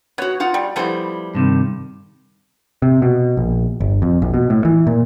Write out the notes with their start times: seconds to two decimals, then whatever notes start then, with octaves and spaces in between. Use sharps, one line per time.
0.18 B3 F#4 C#5
0.40 D#4 F4 F#5
0.54 G3
0.76 F3 G3 A3 B3 E4 C5
1.35 G2 C3 D#3
2.82 C3
3.02 B2
3.37 A#1
3.80 G1
4.02 F2
4.22 A#1
4.34 B2
4.50 A2
4.65 E3
4.87 A#2